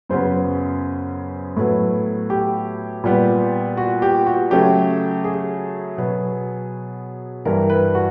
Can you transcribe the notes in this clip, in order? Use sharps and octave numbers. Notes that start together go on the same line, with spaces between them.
F#2 C#3 F#3 B3 C5
A2 F#3 B3 B4
G4
A#2 G3 B3
F#4
G4
F#4
C#3 F#3 A3 G4
G#4
B2 F#3 B3
G2 E3 G3 A#4
B4
F#4